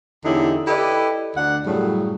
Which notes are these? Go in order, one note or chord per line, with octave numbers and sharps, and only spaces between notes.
E2 D3 C#4 D#4 E4 G4
E4 G4 A4 B4 D5 D#5
D2 D4 F#5
F#2 A2 C#3 F#3 G3